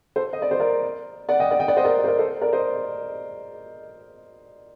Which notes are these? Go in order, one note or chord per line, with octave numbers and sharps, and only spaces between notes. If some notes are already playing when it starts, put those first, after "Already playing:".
A4 C5
D#5
D5
C5
A#4 D5
D5 F#5
D#5 G5
D5 F#5
D#5 G5
D5 F#5
C5 D#5
A#4 D5
C5
A#4 D5
A4 C5
A#4 D5
C5 D#5